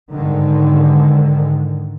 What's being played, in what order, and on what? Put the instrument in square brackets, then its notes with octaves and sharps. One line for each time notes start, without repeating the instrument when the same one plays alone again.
[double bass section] G#2 D3 D#3